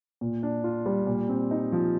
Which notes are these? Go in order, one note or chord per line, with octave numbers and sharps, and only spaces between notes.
A#2
D4
F4
G3
A#2
C4
D#4
F3